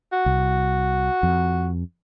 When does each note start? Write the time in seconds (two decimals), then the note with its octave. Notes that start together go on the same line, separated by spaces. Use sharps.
0.12 F#4
0.26 C2
1.23 F2